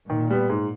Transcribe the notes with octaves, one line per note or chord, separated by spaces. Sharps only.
A#2 D#3
G3 B3
G#2